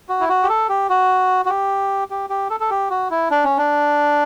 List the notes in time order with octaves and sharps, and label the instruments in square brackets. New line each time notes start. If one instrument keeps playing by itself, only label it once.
[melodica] F#4
E4
F#4
G4
A4
G4
F#4
F#4
G4
G4
G4
A4
A4
G4
F#4
E4
D4
C#4
D4